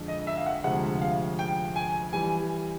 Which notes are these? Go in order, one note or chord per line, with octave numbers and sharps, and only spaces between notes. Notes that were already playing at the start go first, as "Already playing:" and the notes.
Already playing: F2 D3 F3 G#3
D#5
E5
F5
F#5
D2 C3 F3 G#3 F#5
F5
G5
G#5
E3 G3 G#5